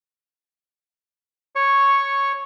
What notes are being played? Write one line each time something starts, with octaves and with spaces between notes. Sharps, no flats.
C#5 C#6